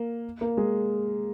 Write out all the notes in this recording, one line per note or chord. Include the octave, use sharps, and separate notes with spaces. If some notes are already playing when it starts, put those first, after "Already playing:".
Already playing: A#3
A#3
G#3